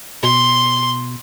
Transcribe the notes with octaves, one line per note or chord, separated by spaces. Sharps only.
B2 C6